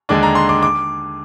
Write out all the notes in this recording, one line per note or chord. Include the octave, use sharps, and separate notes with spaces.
D#2 D3 G#3 D4 D6
A#5
C6
D6
D6